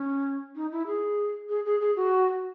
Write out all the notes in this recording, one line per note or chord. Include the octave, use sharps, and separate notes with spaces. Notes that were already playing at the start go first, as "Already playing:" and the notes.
Already playing: C#4
D#4
E4
G#4
G#4
G#4
G#4
F#4